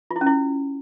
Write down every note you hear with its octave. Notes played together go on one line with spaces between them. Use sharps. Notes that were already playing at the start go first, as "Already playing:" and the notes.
F4
E4
C#4
E4